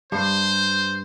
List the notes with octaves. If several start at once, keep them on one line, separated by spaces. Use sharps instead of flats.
G2 C5